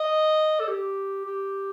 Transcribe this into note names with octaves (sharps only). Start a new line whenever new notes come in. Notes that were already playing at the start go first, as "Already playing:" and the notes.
Already playing: D#5
A4
G4
G4